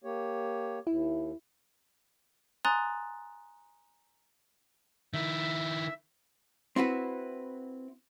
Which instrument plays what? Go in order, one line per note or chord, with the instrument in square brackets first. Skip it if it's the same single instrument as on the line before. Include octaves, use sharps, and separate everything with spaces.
[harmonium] A#3 G4 C#5
[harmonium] D#2 [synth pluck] E4
[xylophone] G#5 A#5 C6 D#6 F#6 A6
[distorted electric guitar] D#3 E4 [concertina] E5
[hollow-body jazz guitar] C4 E4 F#4 B4